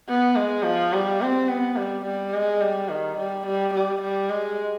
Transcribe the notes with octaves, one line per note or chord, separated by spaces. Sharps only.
B3
G#3
F3
G3
C4
B3
G3
G3
G#3
G3
D#3
G3
G3
G3
G3
G#3